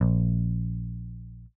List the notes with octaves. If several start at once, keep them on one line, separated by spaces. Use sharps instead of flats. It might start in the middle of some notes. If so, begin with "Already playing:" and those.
A#1